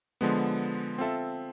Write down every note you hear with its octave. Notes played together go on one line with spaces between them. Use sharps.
D3 F3 G#3 B3
C4 F4 A4 E5